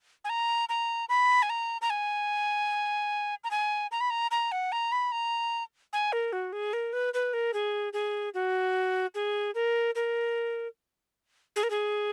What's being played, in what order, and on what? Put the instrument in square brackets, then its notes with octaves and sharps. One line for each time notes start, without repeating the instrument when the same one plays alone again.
[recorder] G#5
A#5
A#5
B5
G#5
A#5
A#5
G#5
A#5
G#5
A#5
B5
A#5
A#5
F#5
A#5
B5
A#5
G#5
A#4
F#4
G#4
A#4
B4
B4
A#4
G#4
G#4
F#4
G#4
A#4
A#4
G#4
A#4
G#4